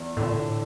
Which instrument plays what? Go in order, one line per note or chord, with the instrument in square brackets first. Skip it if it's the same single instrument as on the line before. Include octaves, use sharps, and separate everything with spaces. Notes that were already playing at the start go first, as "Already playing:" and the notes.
Already playing: [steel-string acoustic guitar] E2
[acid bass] A2 [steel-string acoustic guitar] D3
[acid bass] A#2
A2